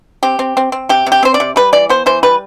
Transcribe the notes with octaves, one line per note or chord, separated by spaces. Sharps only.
C4 G4
C4
C4
C4
C3 G4
C3
G4
C4 C5
D5
C3
G3 B4
E3 D5
B3 C5
E3 C5
G3 B4